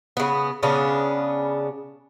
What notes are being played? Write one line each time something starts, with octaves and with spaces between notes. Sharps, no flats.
C#3 B3
C#3 B3 C#4 D4